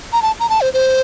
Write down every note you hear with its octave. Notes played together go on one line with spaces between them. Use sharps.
A#5
A5
A#5
A5
C5
C5